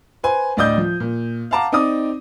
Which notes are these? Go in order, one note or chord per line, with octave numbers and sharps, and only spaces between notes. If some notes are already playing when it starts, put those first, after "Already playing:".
B4 C5 G#5
D2 A2 D5 D#5 D#6 G6
F3
A#2
F5 F#5 A5 A#5 D6
C4 D#4 D5 D6 D#6